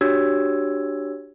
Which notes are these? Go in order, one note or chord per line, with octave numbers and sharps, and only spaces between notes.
D4 F#4 G4 C#5 E6 G#6